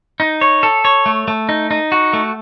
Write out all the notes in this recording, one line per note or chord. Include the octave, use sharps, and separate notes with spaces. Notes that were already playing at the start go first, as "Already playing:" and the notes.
D#4
C#5
A4
C#5
A3
A3
D#4
D#4
F#4
A3